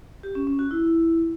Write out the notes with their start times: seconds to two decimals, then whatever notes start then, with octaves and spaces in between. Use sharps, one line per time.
0.23 G4
0.35 C#4
0.47 C#4
0.59 F#4
0.71 E4